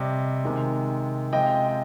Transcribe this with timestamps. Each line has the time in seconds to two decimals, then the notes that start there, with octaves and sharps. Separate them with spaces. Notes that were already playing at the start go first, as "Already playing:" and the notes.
Already playing: C3 G3 D#5
0.44 C3 D#3 G#3
1.33 C3 F3 G#3 D#5 G5
1.69 G5